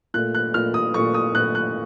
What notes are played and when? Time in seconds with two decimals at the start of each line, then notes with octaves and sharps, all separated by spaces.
0.14 A#2 A3 F#6
0.35 F#6
0.54 A#2 A3 F6
0.74 D#6
0.94 A#2 A3 C#6
1.14 D#6
1.34 A#2 A3 F#6
1.55 F#6